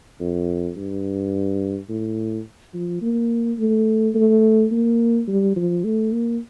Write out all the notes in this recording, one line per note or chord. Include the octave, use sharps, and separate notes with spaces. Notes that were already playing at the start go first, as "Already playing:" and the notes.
F2
G2
A2
F3
A#3
A3
A3
A#3
G3
F3
A3
A#3